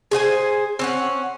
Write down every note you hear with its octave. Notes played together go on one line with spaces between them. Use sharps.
G#4 C5 F#5 G#5
C4 C#4 F#5